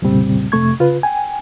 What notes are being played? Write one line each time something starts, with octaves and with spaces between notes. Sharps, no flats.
C2 F2 A#2 C#3 G3 C4
F2 C3 A3 C#6 G#6
C#3 F4 B4
G5 G#5